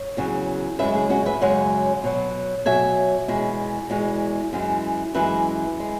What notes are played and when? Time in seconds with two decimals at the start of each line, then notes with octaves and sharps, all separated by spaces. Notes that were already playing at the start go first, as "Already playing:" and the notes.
Already playing: C#5
0.17 E2 C#3 F#3
0.79 F#2 C#3 G#3 B4 E5
0.95 E4 G#4
1.10 C#4 F#4
1.26 B4 E5
1.41 F#2 C#3 G#3 C#5 F#5
2.04 B2 F#3
2.65 B2 F#3 E5 G#5
3.28 E2 B2 G#3
3.90 E2 B2 G#3
4.53 F#2 E3 G#3
5.14 F#2 E3 G#3 B4 E5
5.80 G#3